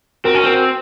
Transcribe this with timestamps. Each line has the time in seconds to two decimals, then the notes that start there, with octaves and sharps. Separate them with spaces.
0.24 C4 F#4 A#4
0.34 C#4
0.43 C4 F#4 A#4